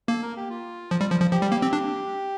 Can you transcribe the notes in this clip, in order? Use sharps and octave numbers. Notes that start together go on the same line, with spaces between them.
A#3 A4
A#4
G4
F4
F3
G3
F3
F3
F3 G4
G3
A#3
C4
D4